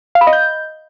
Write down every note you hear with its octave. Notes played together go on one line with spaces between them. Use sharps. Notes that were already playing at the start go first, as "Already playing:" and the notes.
F5
B5
D#5
G6